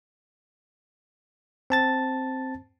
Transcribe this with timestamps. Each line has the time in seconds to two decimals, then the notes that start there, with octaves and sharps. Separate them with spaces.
1.70 C4 A5 A6